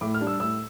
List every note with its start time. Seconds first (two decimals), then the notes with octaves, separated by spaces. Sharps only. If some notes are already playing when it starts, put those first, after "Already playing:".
0.01 A2 D6
0.14 F6
0.21 G3 D4
0.27 E6
0.40 A2 E6